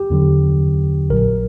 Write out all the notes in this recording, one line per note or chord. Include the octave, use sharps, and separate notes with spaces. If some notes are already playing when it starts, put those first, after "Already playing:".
Already playing: G4
E2 D3 F#3
A#1 A#2 F#3 A#4